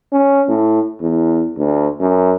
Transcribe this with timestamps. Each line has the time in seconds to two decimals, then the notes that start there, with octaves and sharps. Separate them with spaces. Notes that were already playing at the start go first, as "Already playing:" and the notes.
0.12 C#4
0.48 A2
1.01 E2
1.57 D2
2.00 F#2